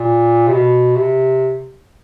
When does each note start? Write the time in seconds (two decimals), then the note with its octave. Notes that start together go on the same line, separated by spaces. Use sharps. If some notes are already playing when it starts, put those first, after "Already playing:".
Already playing: A#2
0.48 C3
0.53 B2
0.96 C3